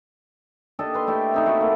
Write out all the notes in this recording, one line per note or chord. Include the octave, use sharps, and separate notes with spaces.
D4 G4 A4 D#5
B4 C6
A3 E4 G4
C4 D#4 A4
A3 E4 F#4
A#3